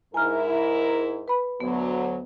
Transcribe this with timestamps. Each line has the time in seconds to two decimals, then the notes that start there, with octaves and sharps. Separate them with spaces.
0.14 G#2 E4 A#4 G#5 A#5 F6
1.28 B4 B5
1.60 D2 F#3 B3